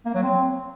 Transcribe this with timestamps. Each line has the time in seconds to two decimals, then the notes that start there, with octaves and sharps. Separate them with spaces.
0.06 A#3
0.14 F#3
0.23 C4